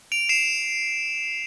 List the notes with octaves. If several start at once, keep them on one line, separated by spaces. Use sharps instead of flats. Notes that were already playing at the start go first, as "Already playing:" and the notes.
D7 F7
C7 E7